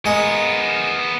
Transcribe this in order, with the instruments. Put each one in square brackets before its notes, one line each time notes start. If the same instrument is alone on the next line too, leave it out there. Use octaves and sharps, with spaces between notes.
[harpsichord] G#3 [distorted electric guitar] B3 A#4